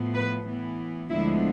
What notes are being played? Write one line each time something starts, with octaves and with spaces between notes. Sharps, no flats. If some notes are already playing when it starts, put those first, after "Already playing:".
Already playing: A2 F3 B3
B4
A2 E3 B3
D2 D3 F3 G#3 B3 E4